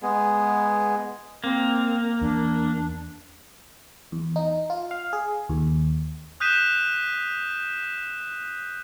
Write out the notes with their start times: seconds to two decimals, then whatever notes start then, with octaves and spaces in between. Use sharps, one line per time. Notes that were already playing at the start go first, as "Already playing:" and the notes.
0.02 G#3 B3 G#4
1.44 A#3 C4
2.21 E2 D4
4.12 E2
4.36 D#4
4.70 F4
4.91 F5
5.13 G#4
5.49 D#2
6.40 D#6 F#6 G6 B6 D#7 E7